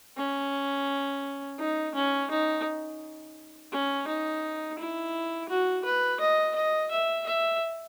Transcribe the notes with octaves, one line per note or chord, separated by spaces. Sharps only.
C#4
D#4
C#4
D#4
C#4
D#4
E4
F#4
B4
D#5
D#5
E5
E5